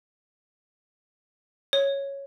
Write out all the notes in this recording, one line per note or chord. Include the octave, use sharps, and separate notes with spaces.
C#5